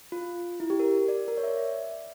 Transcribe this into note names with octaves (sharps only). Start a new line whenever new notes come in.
F4
E4
G4
A#4
D5
A#4
C#5
E5
D5
E5